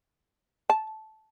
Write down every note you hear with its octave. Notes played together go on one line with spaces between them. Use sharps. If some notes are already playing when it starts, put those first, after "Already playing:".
A5